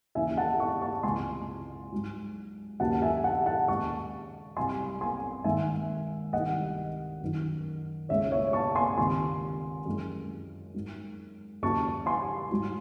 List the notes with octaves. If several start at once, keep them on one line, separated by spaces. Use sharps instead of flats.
D#2 C#3 E3 E5 G#5
F#5 A5
A5 C#6
A5 C#6
C#2 C3 E3 G#3 G#5 C6
G#2 F#3
D#2 C#3 F#3 F#5 A5
E5 G#5
F#5 A5
F#5 A5
D#2 C#3 G#3 A5 C#6
C2 C3 F#3 G#5 C6
G#5 C6
G#2 D#3 G#3 E5 G#5
C2 C3 D#3 D#5 F#5
F#2 D#3 F#3
C#2 C#3 G#3 C#5 E5
C#5 E5
A5 C#6
G#5 C6
C#2 C3 D#3 G#5 C6
F#2 E3 G#3
G#2 F#3
D#2 C#3 F#3 A5 C#6
G#5 C6
G#2 F#3